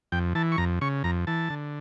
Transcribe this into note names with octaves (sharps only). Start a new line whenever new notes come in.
F2 G5
E3 A5
C#6
F2 A#5
C#3 C#6
F2 A#5
E3 A5
D3